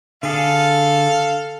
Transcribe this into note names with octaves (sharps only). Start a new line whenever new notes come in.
D3 G#4 A4 F5